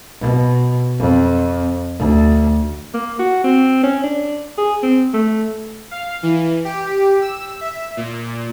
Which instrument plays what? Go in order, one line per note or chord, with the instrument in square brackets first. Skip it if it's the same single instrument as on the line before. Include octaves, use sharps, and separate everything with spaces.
[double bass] B2
F2
D2
[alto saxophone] A#3
F#4
C4
C#4
D4
G#4
C4
A3
[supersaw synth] F5
E3
G4
E6
E5
A#2